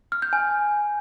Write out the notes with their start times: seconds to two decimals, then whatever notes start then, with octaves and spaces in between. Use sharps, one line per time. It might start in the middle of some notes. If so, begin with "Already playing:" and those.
0.12 F6
0.22 G6
0.33 G#5